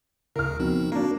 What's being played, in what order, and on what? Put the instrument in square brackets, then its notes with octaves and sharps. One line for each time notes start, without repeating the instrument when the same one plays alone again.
[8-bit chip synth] D2 C#3 [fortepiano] A#4 F6
[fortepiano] B2 [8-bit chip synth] F3 C4 D#4
[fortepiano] A#3 D4 [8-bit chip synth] F#4 A#4